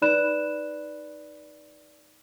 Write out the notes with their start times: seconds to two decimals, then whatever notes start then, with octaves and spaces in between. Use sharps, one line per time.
0.02 D#4 B4 D5 B5 F#6 E7